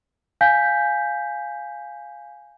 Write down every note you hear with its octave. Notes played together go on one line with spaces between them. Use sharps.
F5 G#5 G6 B6